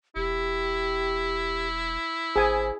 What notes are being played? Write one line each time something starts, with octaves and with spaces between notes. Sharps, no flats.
E1 E4 G4
G#1 G#4 C5 G#5